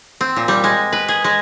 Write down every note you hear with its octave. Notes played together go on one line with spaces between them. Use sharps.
C4
A#2
G3
G#3
B4
G#4
G#3